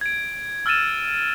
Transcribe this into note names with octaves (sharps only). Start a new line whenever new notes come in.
G#6 D7
E6 F6 G#6 A6 D#7 E7